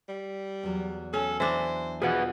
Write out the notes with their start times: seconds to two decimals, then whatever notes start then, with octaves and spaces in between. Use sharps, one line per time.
0.09 G3
0.63 E2 F#3
1.14 C#4 A4
1.40 E3 D4 C5
2.02 B2 F3 G#4 B4 F#5